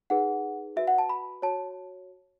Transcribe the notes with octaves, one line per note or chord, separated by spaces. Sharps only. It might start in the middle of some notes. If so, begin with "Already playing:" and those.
D#4 G#4 B4 F#5
F#4 B4 E5
F#5
A5
B5
F#4 C#5 A5